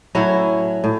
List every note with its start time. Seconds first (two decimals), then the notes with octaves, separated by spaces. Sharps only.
0.15 A2 F#3 C#4 E4
0.84 A2